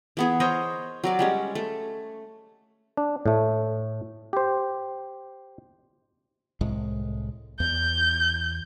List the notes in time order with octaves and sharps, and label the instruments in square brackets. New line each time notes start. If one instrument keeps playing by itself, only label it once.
[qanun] E3 B3 G#4
A#4 C5 C#5 D#5
F#3 A#4 D5
G3 G#3 C#4
A3
[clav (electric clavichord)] D4
A2 A3
G4 C5
[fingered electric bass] C2 A2 G#3
[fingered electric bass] E2 [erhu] G6